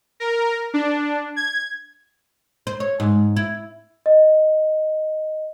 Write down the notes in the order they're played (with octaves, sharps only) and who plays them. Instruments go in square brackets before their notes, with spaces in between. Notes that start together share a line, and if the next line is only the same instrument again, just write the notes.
[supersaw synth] A#4
D4
G#6
[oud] C5
C#5
G#2
E4
[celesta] D#5